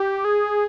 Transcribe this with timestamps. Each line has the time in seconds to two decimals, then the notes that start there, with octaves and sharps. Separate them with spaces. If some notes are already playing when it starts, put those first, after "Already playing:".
Already playing: G4
0.25 G#4